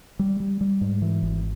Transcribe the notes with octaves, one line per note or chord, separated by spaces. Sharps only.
G3
G3
G3
G#2
E3
G#1